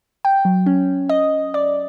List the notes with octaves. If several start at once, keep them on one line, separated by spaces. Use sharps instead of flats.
G5
F#3
C#4
D#5
D5